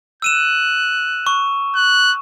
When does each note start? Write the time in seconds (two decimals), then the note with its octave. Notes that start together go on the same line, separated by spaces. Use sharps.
0.22 E6 F#6 D#7 E7
1.27 C#6
1.75 F#6